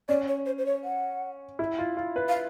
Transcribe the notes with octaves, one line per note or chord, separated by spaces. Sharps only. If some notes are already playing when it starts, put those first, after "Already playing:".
C#4 D5
C#5
C5
C5
C#5
F#5
E4
F4
F4
B4
F5